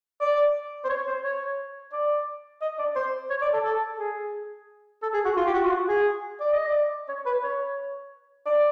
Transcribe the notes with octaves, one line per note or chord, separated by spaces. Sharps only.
D5
C5
C#5
C5
C#5
D5
D#5
D5
C5
C#5
D5
A4
A4
G#4
A4
G#4
F#4
F4
G4
F#4
F4
F#4
G#4
D5
D#5
D5
C#5
B4
C#5
D5